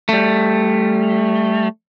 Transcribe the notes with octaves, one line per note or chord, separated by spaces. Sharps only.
G3 A3